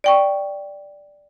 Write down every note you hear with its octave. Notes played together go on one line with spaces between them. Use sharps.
D5 G5 C#6